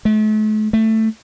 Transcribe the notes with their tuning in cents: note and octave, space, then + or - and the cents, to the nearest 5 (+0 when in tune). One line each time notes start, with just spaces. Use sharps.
A3 -40
A3 +10